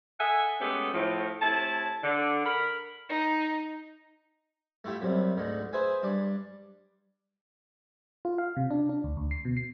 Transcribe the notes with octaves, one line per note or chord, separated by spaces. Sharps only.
A4 D#5 E5 F#5 G#5
G#3 A3 B3 C#4 G4 A4
A2 F3
A2 C3 E4 G#5 A5
D3
A#4 B5
D#4
A3 E4 F4 G4 E5
F#2 C3 G3
D2 G#2 D3 D#3
G#4 B4 C5 E5 G#5
G2 D4 D6
F4
F5
C3
D4
D4
D2
D2
C7
B2
C7